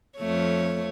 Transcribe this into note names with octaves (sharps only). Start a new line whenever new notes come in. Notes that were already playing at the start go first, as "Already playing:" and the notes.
F2 A3 C#5